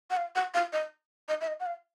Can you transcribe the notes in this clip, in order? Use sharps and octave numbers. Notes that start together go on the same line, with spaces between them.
F#5
F5
F#5
F5
D#5
D#5
E5
D#5
F#5
F5